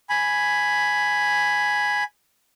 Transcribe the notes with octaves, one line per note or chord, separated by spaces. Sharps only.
G#5 B5